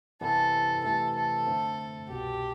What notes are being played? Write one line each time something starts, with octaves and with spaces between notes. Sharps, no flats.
C3 E3 G3 B3 E4 A4
C3 E3 A3 A4
A4
D3 A3 C4
C2 B2 B3 G4